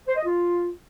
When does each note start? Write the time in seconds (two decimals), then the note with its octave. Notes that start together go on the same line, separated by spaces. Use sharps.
0.07 C5
0.16 D#5
0.24 F4